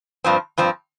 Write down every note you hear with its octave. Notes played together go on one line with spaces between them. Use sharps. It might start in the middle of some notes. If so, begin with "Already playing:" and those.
G2 F3 C4
G2 F3 C4